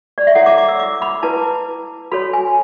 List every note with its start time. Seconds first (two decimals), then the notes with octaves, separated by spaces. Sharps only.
0.18 D5
0.27 E5
0.35 E4 A4 C#5 F#5
0.46 D6
0.58 D6
0.69 E6
0.79 D6
1.02 B5
1.23 E4 B4 A5
2.12 F#4 A4 C#5 B5
2.33 G#5